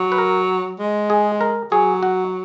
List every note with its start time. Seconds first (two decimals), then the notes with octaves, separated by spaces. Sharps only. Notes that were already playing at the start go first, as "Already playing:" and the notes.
Already playing: F#3
0.12 B4
0.18 A#4
0.79 G#3
1.10 G#4
1.41 A#4
1.72 F#3 G#4
2.03 F#4